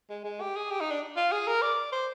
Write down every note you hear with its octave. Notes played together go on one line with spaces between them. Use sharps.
G#3
G#3
G4
G#4
G4
D#4
D4
F4
G#4
A#4
D5
C5